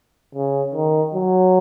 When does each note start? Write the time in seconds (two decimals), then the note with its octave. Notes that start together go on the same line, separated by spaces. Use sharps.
0.35 C#3
0.74 D#3
1.14 F#3